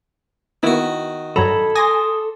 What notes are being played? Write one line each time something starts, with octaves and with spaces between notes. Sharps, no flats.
D#3 A#3 B3 E4 F#4
G2 F#3 A4 A#5 B5 G#6
G#5 C6 D6 D#6 A#6